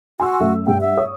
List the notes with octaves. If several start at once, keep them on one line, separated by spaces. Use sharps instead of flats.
F#4 G#5 C6 E6
F#2 A3 E5
G2 F#5 G5
E5
C#5 D#6